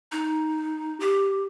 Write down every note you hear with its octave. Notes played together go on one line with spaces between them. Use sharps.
D#4
G4